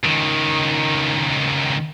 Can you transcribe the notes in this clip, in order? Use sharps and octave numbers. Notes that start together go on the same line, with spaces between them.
C#2 D#3